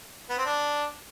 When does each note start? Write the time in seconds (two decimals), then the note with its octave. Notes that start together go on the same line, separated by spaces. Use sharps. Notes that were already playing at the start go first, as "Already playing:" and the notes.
0.29 B3
0.38 C4
0.46 D4